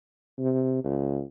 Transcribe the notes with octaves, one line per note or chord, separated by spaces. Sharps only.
C3
C#2